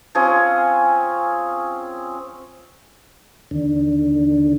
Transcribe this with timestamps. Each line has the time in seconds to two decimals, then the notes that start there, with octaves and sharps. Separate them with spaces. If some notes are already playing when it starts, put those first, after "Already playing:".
0.15 F3 C4 C#4 G#4
3.51 D#2 D3